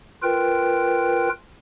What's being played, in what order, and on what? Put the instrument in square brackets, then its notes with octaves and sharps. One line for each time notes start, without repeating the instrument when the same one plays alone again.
[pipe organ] F4 A#4 B4 G5